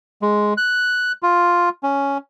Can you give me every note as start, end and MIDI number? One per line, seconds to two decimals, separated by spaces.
0.22 0.53 56
0.57 1.12 90
1.23 1.69 65
1.83 2.18 61